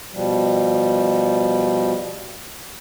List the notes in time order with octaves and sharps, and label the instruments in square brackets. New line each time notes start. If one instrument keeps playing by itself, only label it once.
[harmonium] B2 F3 G3